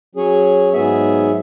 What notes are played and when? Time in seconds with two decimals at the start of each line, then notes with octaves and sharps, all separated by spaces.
0.15 F#3 C#4 G#4 C#5
0.73 G#2 F#3 B3 G#4 E5